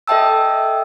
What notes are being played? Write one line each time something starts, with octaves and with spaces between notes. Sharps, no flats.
A4 D#5 E5 G5 A5 E6